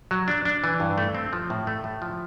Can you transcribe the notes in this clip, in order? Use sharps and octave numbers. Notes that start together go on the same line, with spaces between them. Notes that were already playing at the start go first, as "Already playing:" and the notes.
F#3
D4
D4
E3
G2
A3
C4
F3
A2
A3
A2
F3